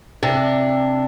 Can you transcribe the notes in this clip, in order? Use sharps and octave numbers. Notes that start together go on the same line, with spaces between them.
C3 D4